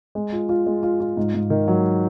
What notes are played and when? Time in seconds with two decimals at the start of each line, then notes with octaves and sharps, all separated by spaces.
0.15 G#3
0.33 F4
0.49 F4
0.66 G#3
0.83 F4
1.01 F4
1.17 G#2
1.35 G#2
1.50 D#3
1.68 F#3